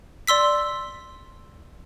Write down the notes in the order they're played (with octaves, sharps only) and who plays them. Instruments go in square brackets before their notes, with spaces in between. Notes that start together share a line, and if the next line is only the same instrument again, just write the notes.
[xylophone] D5 C6 E6 B6